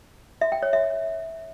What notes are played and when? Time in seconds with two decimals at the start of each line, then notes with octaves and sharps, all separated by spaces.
0.41 E5
0.52 G5
0.63 C#5
0.73 E5